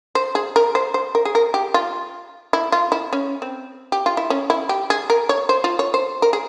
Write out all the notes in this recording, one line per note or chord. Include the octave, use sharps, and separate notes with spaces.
C5
G#4
A#4
C5
C5
A#4
G#4
A#4
G4
F4
E4
F4
E4
C#4
C4
G4
F4
E4
C#4
E4
G4
G#4
A#4
C#5
C5
F4
C#5
C5
A#4
G#4